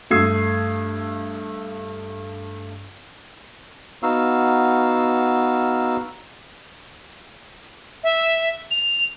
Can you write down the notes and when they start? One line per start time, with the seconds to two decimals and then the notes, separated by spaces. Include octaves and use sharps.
0.11 G2 A3 D#6 E6 G#6 C7
4.03 B3 D#4 F#4 F5 E6
8.03 E5
8.71 F7